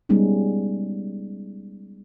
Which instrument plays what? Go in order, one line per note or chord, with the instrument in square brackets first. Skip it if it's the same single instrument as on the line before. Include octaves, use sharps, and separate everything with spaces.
[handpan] G3 G#3 B3 C#4 D#4